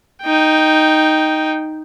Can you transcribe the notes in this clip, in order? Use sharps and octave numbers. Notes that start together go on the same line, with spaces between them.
D#4 G5